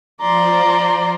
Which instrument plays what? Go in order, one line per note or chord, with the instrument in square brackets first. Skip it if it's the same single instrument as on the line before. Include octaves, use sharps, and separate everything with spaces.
[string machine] F3 [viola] D5 C6 [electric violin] A#5